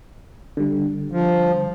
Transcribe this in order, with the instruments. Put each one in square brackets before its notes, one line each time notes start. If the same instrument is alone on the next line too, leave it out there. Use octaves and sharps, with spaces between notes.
[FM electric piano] D3 G3
[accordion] F3